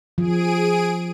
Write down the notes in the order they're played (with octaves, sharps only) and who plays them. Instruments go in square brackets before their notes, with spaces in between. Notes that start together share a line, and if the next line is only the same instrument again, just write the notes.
[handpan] F3 [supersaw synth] G#4 D7 D#7